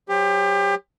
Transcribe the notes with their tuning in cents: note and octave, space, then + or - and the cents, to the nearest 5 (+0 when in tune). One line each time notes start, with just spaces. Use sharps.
F#3 +5 G4 +30 C5 +0